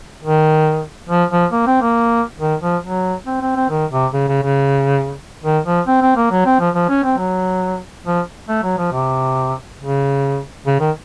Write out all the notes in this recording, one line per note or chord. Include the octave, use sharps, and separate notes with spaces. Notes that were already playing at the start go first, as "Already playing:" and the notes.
D#3
F3
F3
A#3
C4
A#3
D#3
F3
F#3
C4
C4
C4
D#3
C3
C#3
C#3
C#3
D#3
F3
C4
C4
A#3
F#3
C4
F3
F3
C#4
C4
F#3
F3
A3
F#3
F3
C3
C#3
C#3
D#3